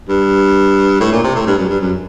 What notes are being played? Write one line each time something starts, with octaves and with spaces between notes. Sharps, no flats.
G2
A2
A#2
C3
A2
G2
F#2
G2
F#2